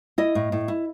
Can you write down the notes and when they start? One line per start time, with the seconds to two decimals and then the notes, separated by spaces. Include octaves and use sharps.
0.18 E4 D#5
0.35 A2
0.52 A2
0.68 E4